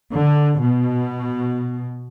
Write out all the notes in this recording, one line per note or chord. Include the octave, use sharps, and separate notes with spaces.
D3
B2